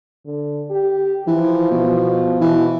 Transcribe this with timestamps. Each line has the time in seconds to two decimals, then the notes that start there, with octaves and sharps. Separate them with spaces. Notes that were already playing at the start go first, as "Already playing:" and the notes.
0.26 D3
0.70 G4
1.27 E3 F3
1.71 B2
2.41 B2 E3